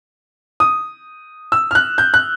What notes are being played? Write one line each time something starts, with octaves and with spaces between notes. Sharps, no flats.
D#6
E6
F6
F#6
G6
F#6